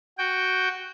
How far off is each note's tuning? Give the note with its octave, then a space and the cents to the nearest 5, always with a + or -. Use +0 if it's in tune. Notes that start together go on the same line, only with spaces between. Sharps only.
F#4 +5 G5 +0